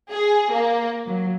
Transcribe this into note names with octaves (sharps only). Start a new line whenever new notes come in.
G#4
A#3
F#3